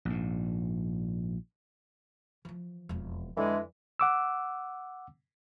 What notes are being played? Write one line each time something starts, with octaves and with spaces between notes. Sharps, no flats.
A#1 G#2
E3 F3
E1 F2
F2 D3 E3 G#3
F#5 D6 E6